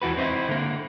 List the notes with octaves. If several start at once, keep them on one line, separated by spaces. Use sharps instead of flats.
E2 E4 F#4 B4
C4 D#4 E4
D3 A#3